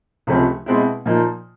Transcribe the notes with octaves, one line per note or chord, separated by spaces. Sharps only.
C#2 C3 F3 A3 C#4
B2 G#3 C4 E4
A#2 F3 A#3 D#4